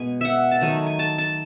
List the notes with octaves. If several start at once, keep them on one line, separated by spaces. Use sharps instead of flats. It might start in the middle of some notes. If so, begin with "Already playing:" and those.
Already playing: B2 G#3 B3 G#5
E5 F#5
A5
D#3 F#3 A3 G#5
G#5
A5
A5